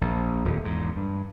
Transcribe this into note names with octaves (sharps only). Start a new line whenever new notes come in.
A#1
D#1 F2
E2 G#2
G2